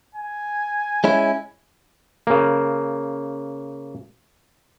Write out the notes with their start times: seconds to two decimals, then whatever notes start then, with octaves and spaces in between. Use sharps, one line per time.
0.15 G#5
1.04 G#3 C#4 E4
2.27 C#3 A#3